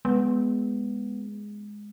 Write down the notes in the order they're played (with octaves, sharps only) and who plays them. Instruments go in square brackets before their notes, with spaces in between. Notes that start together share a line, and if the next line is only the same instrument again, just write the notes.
[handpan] G#3 [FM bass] B3